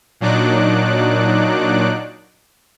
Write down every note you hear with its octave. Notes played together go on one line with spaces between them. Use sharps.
A#2 F#3 D4 D#4 D6 F#6